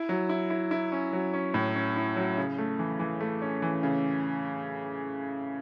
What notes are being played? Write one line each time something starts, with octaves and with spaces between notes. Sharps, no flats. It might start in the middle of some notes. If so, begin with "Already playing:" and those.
Already playing: E4
F#3
E4
E4
E4
C#4
F#3
C#4
A2
C#4
E4
F#3
C#3
A3
E3
E3
A3
C#4
E3
C#3